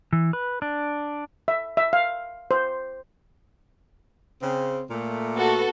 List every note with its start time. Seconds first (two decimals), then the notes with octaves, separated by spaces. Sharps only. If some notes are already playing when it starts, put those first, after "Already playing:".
0.13 E3
0.33 B4
0.62 D4
1.48 E5
1.77 E5
1.93 F5
2.51 C5
4.42 C#3 C4
4.90 A#2 A3
5.35 B3 F#4 A4